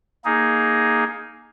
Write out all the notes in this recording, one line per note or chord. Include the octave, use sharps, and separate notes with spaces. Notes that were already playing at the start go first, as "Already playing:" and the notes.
A#3 D#4 G#4